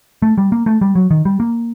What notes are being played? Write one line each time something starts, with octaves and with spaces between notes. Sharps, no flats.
A3
G3
A#3
A3
G3
F#3
D#3
G3
A#3